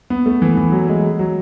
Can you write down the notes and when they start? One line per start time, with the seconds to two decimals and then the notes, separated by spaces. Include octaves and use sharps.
0.10 B3
0.26 A3
0.42 E3
0.57 E3
0.72 F#3
0.88 G#3
1.19 F#3